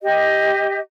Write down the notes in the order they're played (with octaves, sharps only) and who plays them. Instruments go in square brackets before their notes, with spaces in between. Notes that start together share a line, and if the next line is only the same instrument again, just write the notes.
[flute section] G4 D#5